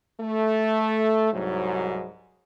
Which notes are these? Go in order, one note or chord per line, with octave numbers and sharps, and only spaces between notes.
A3
C2 G#2 F#3